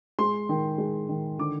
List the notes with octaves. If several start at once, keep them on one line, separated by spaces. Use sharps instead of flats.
G#3 C6
D#3
G#3
D#3
D3 D6